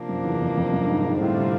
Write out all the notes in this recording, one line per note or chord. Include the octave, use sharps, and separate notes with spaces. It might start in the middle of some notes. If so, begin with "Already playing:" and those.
Already playing: C3 F3 A#3 D4
F#2
E2
F2
F2
F#2
G2
G#2
G#2
A2 D3 G3 C4 F4
C3